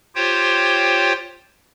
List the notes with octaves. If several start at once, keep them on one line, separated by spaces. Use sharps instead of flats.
F4 G4 C5 C#5 G5